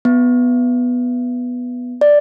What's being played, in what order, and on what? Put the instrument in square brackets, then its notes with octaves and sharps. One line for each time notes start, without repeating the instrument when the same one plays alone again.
[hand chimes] B3
D5